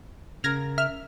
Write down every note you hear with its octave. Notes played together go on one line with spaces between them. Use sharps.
C#3 A#4 F6 G#6 A#6
E5 F6